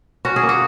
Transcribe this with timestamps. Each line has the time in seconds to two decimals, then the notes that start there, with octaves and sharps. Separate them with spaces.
0.25 C#4 F#4
0.36 G#4
0.43 A#3
0.49 F#4